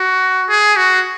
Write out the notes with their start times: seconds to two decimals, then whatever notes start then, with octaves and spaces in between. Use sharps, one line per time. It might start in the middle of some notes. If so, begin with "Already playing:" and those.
Already playing: F#4
0.48 G#4
0.76 F#4